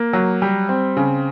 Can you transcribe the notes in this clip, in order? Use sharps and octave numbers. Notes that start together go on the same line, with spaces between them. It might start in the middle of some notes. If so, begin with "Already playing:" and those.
Already playing: A#3
F#3
G3
C4
C#3